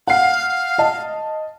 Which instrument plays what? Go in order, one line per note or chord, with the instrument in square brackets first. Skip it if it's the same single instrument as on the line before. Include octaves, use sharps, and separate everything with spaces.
[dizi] F5 [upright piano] F#5 C7
[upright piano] D#5 A5